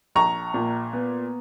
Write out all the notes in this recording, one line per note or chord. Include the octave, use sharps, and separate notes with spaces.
A#1 A#5 C#6
A#2
B3